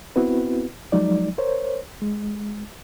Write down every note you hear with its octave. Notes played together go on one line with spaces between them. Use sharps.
B3 C4 E4 F#4 B4
F3 F#3 G#3 D#4 D5
A#4 C5 C#5
G#3